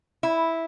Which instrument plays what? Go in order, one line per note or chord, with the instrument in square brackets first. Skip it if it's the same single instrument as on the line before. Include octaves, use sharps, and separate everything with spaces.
[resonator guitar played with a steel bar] E4